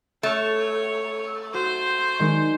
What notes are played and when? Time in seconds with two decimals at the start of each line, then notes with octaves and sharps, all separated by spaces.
0.23 A3 C#5 F6
1.54 F#4 C5
2.20 D#3 G#3 D4